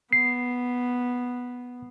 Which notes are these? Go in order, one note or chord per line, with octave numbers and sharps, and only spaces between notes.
B3 C7